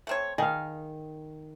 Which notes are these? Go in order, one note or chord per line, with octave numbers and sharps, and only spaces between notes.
A3 C4 C#5
D#3 G#4 F5